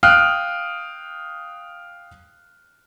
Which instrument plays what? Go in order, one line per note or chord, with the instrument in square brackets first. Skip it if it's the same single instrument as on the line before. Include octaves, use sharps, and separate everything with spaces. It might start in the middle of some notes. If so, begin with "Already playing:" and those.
[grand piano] F5 G5 D#6 F6 F#6